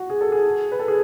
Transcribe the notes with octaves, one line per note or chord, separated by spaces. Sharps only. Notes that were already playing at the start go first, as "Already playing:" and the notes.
Already playing: F#4
G#4
A4
G#4
B4
A4
G#4